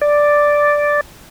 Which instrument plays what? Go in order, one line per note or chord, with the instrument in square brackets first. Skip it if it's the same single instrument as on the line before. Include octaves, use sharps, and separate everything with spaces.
[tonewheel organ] D5